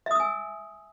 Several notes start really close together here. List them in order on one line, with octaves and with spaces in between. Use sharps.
E5 D#6 E6 G#5